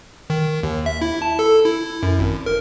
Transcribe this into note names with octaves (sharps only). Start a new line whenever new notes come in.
D#3
D#2
E5
E4
A5
A4
E4
F#2
G#1
A#4